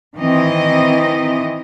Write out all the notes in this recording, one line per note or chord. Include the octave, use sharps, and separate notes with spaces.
D#3 E3 C4 D#5